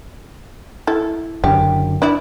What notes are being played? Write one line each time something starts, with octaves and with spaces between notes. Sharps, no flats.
E4 A4
F#1 F#2 D3 G4
D4 E4